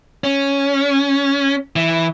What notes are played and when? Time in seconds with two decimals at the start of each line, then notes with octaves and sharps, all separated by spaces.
0.24 C#4
1.76 E3